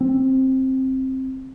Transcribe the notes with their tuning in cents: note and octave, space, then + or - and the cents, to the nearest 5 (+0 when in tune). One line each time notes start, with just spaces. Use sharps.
C4 +10